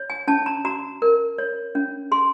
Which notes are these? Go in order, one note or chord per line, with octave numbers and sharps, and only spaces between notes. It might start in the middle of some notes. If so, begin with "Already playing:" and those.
Already playing: C#5
G#5
C#4 A5
A#5
F#4 A#5
A#4
C#5
C#4
G#4 C6